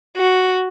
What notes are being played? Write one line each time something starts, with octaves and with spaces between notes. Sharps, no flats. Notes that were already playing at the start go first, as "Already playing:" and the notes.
F#4